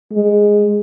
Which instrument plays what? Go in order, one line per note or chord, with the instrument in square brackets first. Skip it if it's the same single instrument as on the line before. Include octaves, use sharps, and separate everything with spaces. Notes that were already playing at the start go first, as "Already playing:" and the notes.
[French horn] G#3